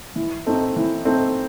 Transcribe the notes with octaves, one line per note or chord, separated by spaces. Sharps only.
E3
A3 C4 D#4
E3
A3 C4 D#4